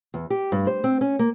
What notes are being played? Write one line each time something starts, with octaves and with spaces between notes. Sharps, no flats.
E2
G4
G2
C5
C4
C#4
A#3